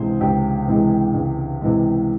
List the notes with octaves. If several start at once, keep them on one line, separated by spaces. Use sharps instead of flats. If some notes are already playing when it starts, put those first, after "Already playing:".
Already playing: C#2 C3 E3 G#3 G#4 C5
C#2 G4
C3 E3 G#3
C#2
C3 E3 G#3